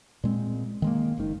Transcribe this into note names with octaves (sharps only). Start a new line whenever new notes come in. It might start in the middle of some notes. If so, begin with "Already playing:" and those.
A#2 G#3 C4
D#3 G#3 A#3
F#1 D#3